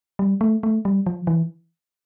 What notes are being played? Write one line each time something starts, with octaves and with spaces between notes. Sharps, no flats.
G3
A3
A3
G3
F3
E3